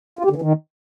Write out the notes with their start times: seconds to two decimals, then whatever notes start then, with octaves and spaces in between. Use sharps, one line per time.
0.19 F4
0.25 G4
0.30 D3
0.36 E3
0.42 D#3